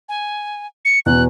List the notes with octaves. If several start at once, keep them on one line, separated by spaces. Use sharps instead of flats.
G#5
C#7
E2 B2 F#6